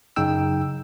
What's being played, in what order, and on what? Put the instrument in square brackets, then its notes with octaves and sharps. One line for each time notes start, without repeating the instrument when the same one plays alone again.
[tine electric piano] F#2 C#3 D#4 G5 E6